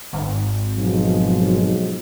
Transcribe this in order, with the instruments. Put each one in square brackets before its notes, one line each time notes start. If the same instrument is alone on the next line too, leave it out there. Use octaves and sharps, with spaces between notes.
[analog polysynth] G#1
[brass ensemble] B1 G#2 F3